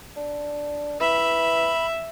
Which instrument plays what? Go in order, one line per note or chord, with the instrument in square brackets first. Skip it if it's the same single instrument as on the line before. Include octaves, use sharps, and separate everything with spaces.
[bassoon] D4
[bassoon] E3 [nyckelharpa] E5 [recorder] B5